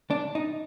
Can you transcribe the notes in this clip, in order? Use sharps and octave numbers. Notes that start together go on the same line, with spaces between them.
D4
D#4